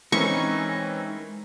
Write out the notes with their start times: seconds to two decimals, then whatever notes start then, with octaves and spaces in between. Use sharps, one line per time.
0.12 E3 G#3 C4 C#4 D#4 A#4 B4 C#6